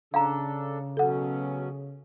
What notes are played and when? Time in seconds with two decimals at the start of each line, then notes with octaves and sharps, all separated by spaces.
0.14 C#3 D4 A4 F5 A#5
0.97 B2 F#3 C#4 A4 F#5